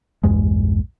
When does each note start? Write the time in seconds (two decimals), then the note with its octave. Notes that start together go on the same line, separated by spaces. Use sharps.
0.23 A#1 E2 G2 G#3